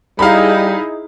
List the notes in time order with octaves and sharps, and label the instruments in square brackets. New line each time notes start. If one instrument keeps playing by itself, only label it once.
[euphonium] G3 [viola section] D#4 E4 G#4 [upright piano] F5 A#5 B5